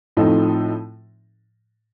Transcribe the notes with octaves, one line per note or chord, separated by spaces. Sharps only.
A2 F3 C4 D#4 A4